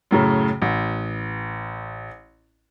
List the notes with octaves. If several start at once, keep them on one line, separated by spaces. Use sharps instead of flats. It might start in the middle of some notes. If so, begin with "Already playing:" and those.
F#2 A2 C#3
A1